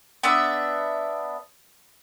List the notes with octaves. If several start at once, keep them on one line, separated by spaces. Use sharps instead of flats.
B3 D4 E5